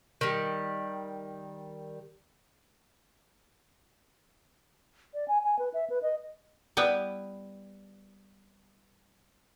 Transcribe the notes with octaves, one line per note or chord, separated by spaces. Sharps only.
D#3 G3
D5
G#5
G#5
B4
E5
B4
D#5
G3 B3 E4 B4